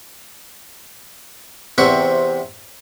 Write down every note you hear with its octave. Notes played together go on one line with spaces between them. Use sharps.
E2 C3 C4 E5 C#6